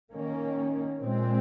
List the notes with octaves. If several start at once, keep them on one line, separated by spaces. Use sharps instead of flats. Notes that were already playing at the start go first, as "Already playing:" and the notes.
D#3 A#3 C#4
A#2 G#3 C4